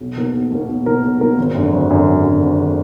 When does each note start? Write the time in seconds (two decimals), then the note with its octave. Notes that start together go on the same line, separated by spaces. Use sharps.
0.01 B1
0.17 B2 A#3 D#4 A#4
0.34 B1
0.52 B2 A#3 D#4 A#4
0.69 B1
0.86 B2 A#3 D#4 A#4
1.03 B1
1.21 B2 A#3 D#4 A#4
1.38 G#1
1.55 F#2 D3
1.73 G#1
1.90 F#2 D3
2.06 G#1
2.24 F#2 D3
2.42 G#1
2.62 D3